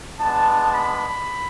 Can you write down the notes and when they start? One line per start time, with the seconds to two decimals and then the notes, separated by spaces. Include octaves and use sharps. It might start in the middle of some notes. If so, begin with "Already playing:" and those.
0.21 G#3 B3 D4 A5
0.73 B5